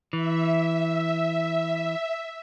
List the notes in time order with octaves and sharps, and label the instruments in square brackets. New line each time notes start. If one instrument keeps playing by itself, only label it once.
[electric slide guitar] E3 [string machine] E5